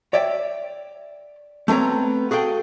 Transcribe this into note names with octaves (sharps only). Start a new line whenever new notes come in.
C#5 D5 E5 G5
A3 B3 C4 C#5 A#5
F#4 G#4 A4 F5 G5